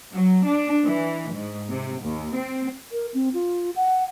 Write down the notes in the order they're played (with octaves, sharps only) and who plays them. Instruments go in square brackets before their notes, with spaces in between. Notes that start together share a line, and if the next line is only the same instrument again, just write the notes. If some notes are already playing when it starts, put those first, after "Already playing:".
[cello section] F#3
D4
E3
G#2
C3
D#2
C4
[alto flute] A#4
C4
F4
F#5